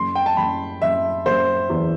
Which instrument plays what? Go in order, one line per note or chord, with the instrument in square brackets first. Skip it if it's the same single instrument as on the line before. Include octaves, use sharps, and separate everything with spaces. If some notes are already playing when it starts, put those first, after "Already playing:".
Already playing: [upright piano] F#1 [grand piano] C6
[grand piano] G5
A5
[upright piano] F#1 [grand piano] B5
[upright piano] F#1 [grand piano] E5
[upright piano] F#1 [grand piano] C5
[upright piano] E2